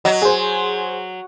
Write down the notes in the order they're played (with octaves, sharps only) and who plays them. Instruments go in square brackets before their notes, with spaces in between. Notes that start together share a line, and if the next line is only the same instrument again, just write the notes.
[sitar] F#3 [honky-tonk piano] D#5
[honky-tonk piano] G#4 C5